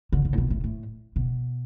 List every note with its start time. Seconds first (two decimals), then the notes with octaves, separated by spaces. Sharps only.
0.12 D3
0.25 D3
0.33 A2
0.38 B2
0.50 A2
0.64 A2
1.16 B2